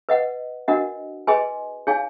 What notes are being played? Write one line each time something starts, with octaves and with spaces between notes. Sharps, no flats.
B4 D#5 F#5
D4 F#4 A#4 D#5 F#5
G#4 B4 D#5 G#5 C6
D#4 G#4 C#5 F5 G#5